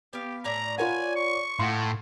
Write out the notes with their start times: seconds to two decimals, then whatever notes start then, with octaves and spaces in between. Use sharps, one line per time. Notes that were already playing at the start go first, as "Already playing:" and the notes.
0.13 B3 G4 F5
0.44 A2 D5 G#5 A#5
0.78 F4 A#4 B4 C#5 D5 F#5 G#5
1.16 C#6
1.59 A2 F5 F#5 C6